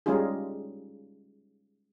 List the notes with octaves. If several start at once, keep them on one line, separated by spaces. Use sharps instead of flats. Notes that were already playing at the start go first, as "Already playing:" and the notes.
G3 G#3 C#4 D#4 F4 G#4